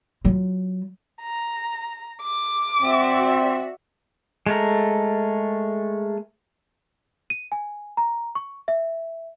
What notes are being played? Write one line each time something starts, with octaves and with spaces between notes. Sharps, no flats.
F#3 F4
A#5
D6
C4 F#4 D5 E5
G#3 A3 A#4
D#7
G#5
A#5
C#6
E5